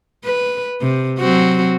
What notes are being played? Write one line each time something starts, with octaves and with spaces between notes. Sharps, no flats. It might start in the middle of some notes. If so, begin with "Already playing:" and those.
B4
C3
F#3 C4 F#4